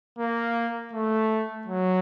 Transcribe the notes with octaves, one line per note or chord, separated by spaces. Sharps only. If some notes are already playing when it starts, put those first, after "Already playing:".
A#3
A3
F#3